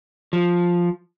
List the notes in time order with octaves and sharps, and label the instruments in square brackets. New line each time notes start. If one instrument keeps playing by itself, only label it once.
[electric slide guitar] F3